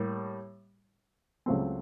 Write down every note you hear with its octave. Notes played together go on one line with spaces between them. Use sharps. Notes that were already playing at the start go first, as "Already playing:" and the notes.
Already playing: A2 G3 A#3
C#2 C#3 F#3 A3 C4